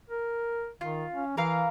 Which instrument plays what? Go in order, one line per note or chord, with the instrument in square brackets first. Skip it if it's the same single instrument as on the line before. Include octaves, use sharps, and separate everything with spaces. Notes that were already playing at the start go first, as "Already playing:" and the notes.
[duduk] A#4
[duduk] D#3 [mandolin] F4
[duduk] C#4
[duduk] E3 [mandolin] A#4 F5